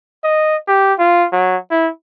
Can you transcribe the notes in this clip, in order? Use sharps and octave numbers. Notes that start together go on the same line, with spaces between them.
D#5
G4
F4
F#3
E4